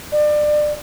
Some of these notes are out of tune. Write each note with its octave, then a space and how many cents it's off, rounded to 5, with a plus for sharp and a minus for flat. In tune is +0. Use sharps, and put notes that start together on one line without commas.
D5 +30